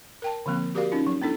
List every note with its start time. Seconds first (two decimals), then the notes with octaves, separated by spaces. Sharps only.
0.22 A#4 G5 A5
0.46 D3 F3 A#3 C4
0.75 F#4 G4 A#4 D5 F5
0.92 C#4 D#4 F4
1.07 F#3
1.22 B3 D4 E4 A4